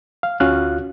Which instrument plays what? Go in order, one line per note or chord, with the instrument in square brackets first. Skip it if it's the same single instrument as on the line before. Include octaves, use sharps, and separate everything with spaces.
[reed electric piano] F5
D2 C#4 F4 F#4 F5 F#6